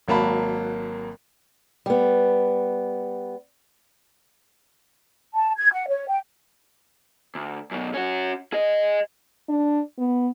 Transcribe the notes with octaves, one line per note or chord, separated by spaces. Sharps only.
G#1 F#3 A#3 A5 B5
G3 B3
A5
G#6
F#5
C#5
G5
D2
F#2 B2
C#4 F#4
G#4 D#5
D4
B3